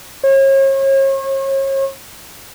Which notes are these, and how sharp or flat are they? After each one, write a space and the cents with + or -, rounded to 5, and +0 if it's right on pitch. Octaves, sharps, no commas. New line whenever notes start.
C#5 -40